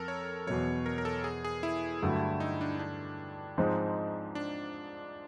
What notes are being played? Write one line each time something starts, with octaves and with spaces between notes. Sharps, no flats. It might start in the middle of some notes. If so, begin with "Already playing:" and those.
Already playing: F2 A4 A#4
C#5
E2 B2 F#3 C#5
A#4
A#4
A4
G#4
G#4
E4
G2 D3 F#3 A3
D#4
D4
D4
G#2 F3 G#3 C4 D#4
D4